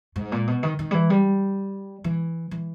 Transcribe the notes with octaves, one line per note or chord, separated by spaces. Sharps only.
G#2
A#2
B2
D#3
D#3
G3
E3
G3
E3
E3